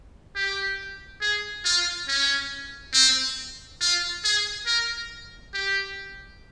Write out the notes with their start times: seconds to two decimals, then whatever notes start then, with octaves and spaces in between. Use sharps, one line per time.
0.35 G4
1.21 G#4
1.65 F4
2.08 C#4
2.94 C4
3.81 F4
4.24 G#4
4.67 A#4
5.54 G4